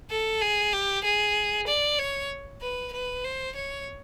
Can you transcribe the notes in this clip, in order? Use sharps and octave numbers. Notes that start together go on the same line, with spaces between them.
A4
G#4
G4
G#4
D5
C#5
B4
B4
C5
C#5